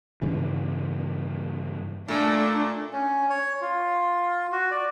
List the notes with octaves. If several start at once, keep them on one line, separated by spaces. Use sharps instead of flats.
G2 C#3 E3
A#2 A3 D4
C#4
C#5
F4
F#4
D5